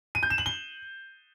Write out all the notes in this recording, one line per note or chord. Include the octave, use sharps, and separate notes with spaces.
D#7
G6
E7
F#7
G7